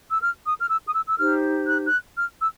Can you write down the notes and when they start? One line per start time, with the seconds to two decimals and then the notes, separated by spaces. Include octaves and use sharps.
0.10 E6
0.21 F6
0.46 D#6
0.60 F6
0.70 E6
0.87 D#6
0.94 E6
1.06 E6
1.18 D#4 G4 C5 F6
1.68 F#6
1.87 F#6
2.17 F6
2.40 E6